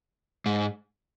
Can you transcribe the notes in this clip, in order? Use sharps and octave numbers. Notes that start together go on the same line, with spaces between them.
G#2